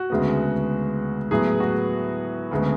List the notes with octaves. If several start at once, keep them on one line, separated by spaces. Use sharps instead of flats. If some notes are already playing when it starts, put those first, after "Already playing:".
Already playing: F#4
D2 C#3 G#3 B3
A2 F#3 B3 G#4
F#4
D2 C#3 G#3 B3